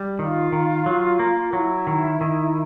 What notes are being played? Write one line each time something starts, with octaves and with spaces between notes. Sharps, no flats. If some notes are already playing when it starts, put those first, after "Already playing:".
Already playing: G3
D#3 F4
D#3
F#3
A#3
F#3 E4
D#3
D#3